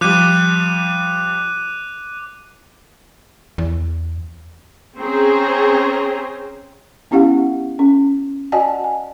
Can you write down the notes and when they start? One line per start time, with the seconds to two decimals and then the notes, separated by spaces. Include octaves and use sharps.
0.01 F3 G3 D6 F#6 D#7
3.58 E2
4.96 C4 C#4 G#4 C5 A#5
7.11 B3 C#4 E4 G4 F5 F#5
7.79 C#4
8.52 F#4 D5 D#5 F#5 G#5 A5
8.84 G#5